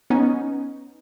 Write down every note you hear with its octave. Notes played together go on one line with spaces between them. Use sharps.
B3 C#4 D#4